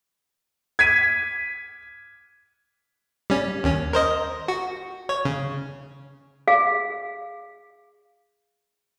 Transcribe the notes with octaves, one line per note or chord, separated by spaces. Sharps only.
G#6 B6 D#7
G3 C#4
D#2 C#4
A#4 C5 D#5
F#4
C#5
C#3
G#4 F5